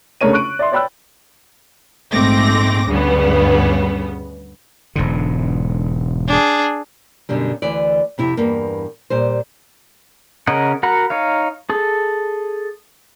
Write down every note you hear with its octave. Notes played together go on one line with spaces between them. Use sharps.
C#3 A3 D4 A#4 C#5 D#7
C#6 F#6 D7
D5 E5 C6
C#5 D5 G5 B5 E6 F#6
A#1 G#2 A3 C4 D6 A#6
D2 G2 C#3 G3 B3
E1 G#2 D3
D4 G#4
F#2 B2 D3 G3
D2 E3 D5
F2 C3 E4
E2 G2 A#3
A#2 G3 C5
C#3 C#4 A#4 D#5 F#5
F#4 A#4 F#5 A#5 B5
D#4 C#5 F5
G#4 A4